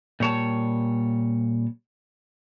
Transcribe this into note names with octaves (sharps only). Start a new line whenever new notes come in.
A#2 G3 C#5 A5